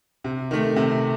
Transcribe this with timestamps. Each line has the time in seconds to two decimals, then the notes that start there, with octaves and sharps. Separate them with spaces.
0.24 C3
0.51 D#3 A3
0.76 C3